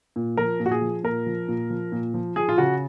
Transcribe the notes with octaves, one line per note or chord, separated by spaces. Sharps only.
A#2
F3 A#4
A#2
F#4
G#4
F3
A#2 A#4
F3
A#2
F3
A#2
F3
F3 G#4
F4
C#3 F#4